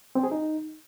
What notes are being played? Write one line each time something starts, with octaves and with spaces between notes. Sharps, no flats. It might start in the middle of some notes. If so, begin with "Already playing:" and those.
C4
G#4
D#4